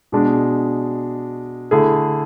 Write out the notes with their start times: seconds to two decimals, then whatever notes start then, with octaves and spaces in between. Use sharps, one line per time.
0.12 B2 G#3 D4
1.71 D3 A3 E4 G#4